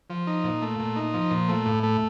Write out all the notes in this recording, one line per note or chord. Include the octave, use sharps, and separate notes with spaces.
F3
D#4
A#2
A3
A#2
D#4
F3
A#2
A3
A2
A3